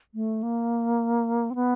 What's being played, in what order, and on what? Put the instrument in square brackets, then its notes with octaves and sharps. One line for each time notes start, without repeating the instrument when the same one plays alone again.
[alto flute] A3
A#3
C4
B3